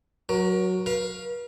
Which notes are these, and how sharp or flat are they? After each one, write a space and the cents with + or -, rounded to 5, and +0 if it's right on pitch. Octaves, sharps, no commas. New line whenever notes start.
F#3 +0 A#4 +35
B4 -45 F5 +0